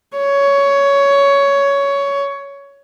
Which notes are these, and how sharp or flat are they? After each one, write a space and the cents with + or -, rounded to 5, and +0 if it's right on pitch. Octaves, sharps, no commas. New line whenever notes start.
C#5 +15